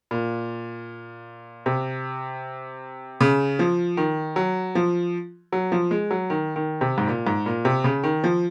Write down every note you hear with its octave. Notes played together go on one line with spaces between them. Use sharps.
A#2
C3
C#3
F3
D#3
F#3
F3
F#3
F3
G#3
F#3
D#3
D#3
C3
G#2
A#2
G#2
A#2
C3
C#3
D#3
F3